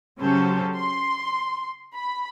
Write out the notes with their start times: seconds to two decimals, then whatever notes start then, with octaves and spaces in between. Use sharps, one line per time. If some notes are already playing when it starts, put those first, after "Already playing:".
0.19 C#3 F#3 C#4 G4 A4 C5
0.74 C6
1.93 B5